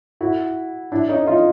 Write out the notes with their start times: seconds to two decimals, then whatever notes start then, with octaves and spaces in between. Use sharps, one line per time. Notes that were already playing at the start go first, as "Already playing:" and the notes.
0.21 E4 F#4
0.92 D4 E4
1.09 C#4 D#4
1.27 D#4 F4